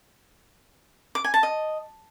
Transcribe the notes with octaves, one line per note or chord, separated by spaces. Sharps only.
D6
G#5
A5
D#5